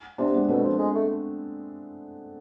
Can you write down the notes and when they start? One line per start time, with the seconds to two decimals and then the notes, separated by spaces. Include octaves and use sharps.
0.18 C3 B3 D4
0.34 G#3 B3
0.49 B2 A3 C4
0.64 F3
0.79 G#3
0.95 A3